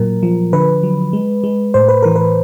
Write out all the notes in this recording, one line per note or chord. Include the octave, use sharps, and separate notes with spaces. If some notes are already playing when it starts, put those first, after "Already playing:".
Already playing: A#2 F#3 A#4
F3
D3 B4
F#3
G#3
G#3
A2 C5
B4
E3 A#4
B4